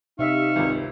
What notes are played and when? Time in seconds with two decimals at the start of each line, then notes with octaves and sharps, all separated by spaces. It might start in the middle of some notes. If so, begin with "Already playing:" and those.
0.19 C3 D#4 E5 F5 C#6
0.56 G#1 C#2